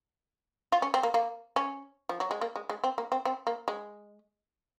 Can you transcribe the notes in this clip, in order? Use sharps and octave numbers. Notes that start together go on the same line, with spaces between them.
F4
C#4
C4
A#3
A#3
C#4
F3
F#3
G#3
A#3
G#3
G#3
C4
A#3
C4
C4
A#3
G#3